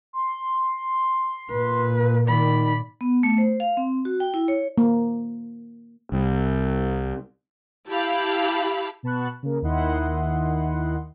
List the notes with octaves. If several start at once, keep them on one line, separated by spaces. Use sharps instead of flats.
C6
A#2 B4
D#3 D5 B5
B3
A3
C5
F5
C4
F#4
G5
E4
C#5
A#3
C2
E4 G4 F5 A5 B5
B2 B3 A5 B5 C#6 F#6
C#3 A#3
D#2 D#3 E4 D#5 F#5 C6